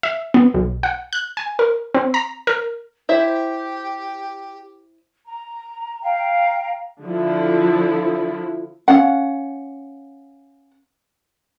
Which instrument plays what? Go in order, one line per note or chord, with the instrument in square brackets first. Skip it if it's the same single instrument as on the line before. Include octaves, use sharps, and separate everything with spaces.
[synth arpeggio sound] E5
B3
B1
F#5
F#6
G#5
A#4
C4
A#5
A#4
[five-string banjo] E4 C5 E5 [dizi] G4
[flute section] A#5
F5 G5 A#5
[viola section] D3 F3 E4
[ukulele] C#4 F5 F#5